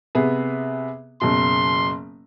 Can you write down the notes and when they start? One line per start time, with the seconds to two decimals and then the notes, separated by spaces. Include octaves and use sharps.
0.15 C3 B3 G#4
1.21 F#1 B2 C6